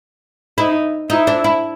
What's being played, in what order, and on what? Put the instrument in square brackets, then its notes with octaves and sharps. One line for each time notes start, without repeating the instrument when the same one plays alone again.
[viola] D#4 [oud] E4
[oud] D#4 [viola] E4
[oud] D4
E4